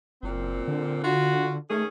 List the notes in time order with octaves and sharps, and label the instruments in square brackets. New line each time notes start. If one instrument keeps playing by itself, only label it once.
[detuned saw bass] F#1 [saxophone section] A#2 C4
[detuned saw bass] D3
[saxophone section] F4 F#4
[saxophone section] D#3 C#4 G#4 [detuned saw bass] A3